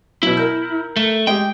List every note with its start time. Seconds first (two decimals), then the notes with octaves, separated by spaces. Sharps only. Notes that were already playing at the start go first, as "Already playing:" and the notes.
0.23 B2 F#3 E4
0.37 A#4 G6
0.96 A3
1.27 G#3 G4 G5